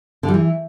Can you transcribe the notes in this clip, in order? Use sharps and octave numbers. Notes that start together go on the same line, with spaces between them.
D3
G3
E3